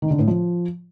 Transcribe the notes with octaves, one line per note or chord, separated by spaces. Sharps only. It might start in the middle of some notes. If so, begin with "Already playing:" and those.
D#3
D3
A2
F3